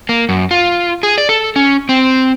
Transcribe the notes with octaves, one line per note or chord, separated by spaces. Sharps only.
A#3
F#2
F4
G#4
D5
A4
C#4
C4